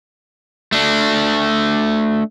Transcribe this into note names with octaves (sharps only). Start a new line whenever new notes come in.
A3 D4